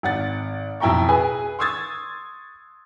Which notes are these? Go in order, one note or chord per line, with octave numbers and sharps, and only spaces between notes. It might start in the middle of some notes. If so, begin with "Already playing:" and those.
G#1 F#5 A6
B1 F2 E4 G5 A#5 C#6
G#4 B4 G#5
C6 C#6 D#6 E6 G#6 A6